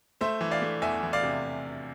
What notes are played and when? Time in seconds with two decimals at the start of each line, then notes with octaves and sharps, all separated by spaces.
0.21 A3 C5 E5
0.41 E3
0.51 D5 F5
0.62 A3
0.82 E2 E5 G#5
1.03 E3
1.13 D5 F5
1.23 C3